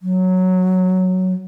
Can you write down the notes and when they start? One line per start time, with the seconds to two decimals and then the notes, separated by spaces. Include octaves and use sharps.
0.02 F#3